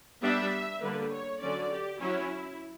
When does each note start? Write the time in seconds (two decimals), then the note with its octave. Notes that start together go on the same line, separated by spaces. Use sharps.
0.22 G3 B3 D4 E5
0.82 D3 G3 A#3 B4
1.10 C#5
1.40 D3 F#3 C#4 D5
1.70 G4
2.00 F#3 C#4 E4